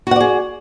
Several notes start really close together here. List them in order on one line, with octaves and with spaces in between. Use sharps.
F#4 F#5 D5 G#4